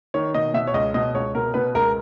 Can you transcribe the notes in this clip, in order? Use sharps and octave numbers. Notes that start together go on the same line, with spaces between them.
D#3 C#5
B2 D#5
B2 E5
C#5
C#2 D#5
B2 D#5
C#2 C#5
B2 A#4
B2 B4
C#2 A#4